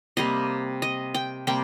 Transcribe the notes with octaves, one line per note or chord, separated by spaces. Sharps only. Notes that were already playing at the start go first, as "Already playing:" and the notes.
C3 G3 A#3 D#5
D#5
G5
C3 G3 A#3 G5